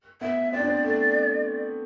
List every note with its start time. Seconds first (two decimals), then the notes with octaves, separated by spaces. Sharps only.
0.21 B3 E5
0.52 C4 D5
0.60 D4
0.68 C4
0.84 A3